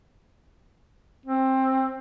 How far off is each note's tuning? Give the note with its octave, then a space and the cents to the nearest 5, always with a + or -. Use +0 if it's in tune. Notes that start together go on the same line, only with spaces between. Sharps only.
C4 +15